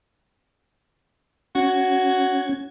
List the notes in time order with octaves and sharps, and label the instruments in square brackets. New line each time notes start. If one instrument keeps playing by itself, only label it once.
[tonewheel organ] C#4 G#6 [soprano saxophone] F#4